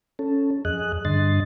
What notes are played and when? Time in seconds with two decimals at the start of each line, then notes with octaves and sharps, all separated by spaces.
0.19 C#4 A4
0.65 F2 G#4 D#5 F#6
1.05 G2 D3 D#5 C6 A6